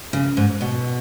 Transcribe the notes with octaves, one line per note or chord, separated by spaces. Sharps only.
C#3
G#2
B2